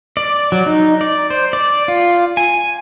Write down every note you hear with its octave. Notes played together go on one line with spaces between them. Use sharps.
D5
F#3
D#4
D5
C5
D5
F4
G#5